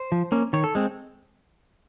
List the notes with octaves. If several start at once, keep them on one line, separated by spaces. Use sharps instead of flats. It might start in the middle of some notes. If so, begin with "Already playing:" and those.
Already playing: C5
F3
A#3 C#4
D#3 C#5
A4
G#3 C4